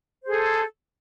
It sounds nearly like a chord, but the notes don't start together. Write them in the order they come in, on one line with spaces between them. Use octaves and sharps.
C5 G#4 A4